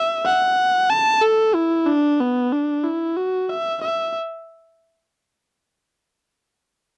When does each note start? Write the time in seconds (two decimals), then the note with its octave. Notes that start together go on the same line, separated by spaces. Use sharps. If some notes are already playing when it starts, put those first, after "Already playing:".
Already playing: E5
0.25 F#5
0.90 A5
1.22 A4
1.55 E4
1.86 D4
2.20 B3
2.53 D4
2.84 E4
3.17 F#4
3.50 E5
3.82 E5